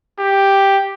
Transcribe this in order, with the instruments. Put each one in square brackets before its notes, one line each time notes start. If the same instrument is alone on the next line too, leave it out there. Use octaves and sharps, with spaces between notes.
[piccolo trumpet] G4